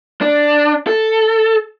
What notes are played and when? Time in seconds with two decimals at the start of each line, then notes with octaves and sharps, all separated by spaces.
0.21 D4
0.87 A4